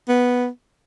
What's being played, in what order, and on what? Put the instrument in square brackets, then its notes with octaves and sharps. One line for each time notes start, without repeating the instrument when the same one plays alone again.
[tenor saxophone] B3